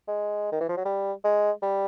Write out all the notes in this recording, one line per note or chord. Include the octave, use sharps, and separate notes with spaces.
G#3
D#3
E3
F3
F#3
G3
G#3
G3